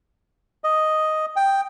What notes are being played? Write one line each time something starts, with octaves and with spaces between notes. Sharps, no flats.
D#5
G5